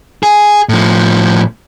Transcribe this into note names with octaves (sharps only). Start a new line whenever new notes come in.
G#4
A2 F3